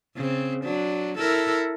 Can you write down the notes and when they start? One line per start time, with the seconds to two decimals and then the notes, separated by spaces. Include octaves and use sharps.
0.16 C#3 C4
0.65 F#3 D4
1.18 E4 A4 A#4